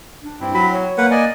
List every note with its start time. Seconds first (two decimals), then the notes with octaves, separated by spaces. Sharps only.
0.23 D4
0.41 G2 C4 E4
0.54 F#3 B5
0.73 C#5
0.98 A#3 B4 F#5
1.11 D5 D#5 G#5